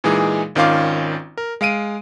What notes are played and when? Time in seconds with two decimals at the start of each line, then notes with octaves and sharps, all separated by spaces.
0.04 A#2 E3 G#3 D#4 G#4
0.55 G#1 D#3 C#4 F4 F5 D6
1.37 A#4
1.61 G#3 F5 D7 D#7